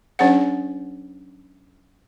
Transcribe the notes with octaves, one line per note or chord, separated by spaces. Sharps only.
F#3 C#4 D4 G#4 C5 F#5